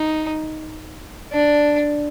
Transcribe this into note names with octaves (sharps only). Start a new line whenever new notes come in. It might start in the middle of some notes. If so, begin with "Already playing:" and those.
Already playing: D#4
D4